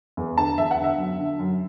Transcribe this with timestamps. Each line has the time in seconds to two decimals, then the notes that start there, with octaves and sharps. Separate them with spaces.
0.17 E2
0.38 D3 A5
0.58 E2 E5
0.71 F#5
0.78 D3
0.84 E5
0.98 F#2
1.18 D3
1.39 F#2